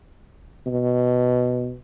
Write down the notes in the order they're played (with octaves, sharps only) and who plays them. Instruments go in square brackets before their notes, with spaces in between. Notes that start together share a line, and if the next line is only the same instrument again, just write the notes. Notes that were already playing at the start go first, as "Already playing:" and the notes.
[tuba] B2